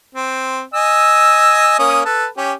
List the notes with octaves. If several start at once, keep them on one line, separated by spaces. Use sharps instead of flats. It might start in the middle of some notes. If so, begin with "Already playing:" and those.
C4
D#5 G#5 E6
A#3 C#4 D#6
A4 B4
C#4 G4